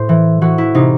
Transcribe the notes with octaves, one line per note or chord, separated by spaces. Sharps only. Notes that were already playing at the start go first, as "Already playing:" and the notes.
Already playing: A2 C5
E3
E3 F#4
E4
C3 D#4